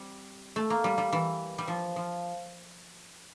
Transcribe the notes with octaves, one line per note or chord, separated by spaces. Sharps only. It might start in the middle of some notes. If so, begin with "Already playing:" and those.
Already playing: G3 C4
A3
A#3
G3
G3
E3
G3
F3
F3